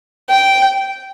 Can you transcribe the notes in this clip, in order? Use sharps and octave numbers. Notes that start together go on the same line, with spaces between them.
G5